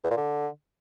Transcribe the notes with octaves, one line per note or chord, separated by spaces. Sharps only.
E2
A#2
D3